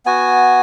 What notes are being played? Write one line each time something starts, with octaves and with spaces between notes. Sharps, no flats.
B3 F#4 G#5